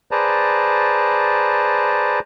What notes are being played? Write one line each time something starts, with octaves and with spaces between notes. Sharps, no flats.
G#4 B4 C5 D5 A5 A#5